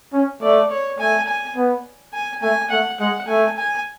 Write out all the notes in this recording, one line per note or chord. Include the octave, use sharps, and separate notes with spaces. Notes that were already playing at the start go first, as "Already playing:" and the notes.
C#4
A3 D5
C#5
A3 G#5
G#5
B3
G#5
A3 G#5
A3 F#5
G#3 F#5
A3 G#5
G#5